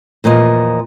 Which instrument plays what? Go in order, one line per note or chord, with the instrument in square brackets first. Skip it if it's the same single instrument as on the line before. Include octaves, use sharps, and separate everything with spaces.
[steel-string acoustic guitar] E2 A#2 F3 D#5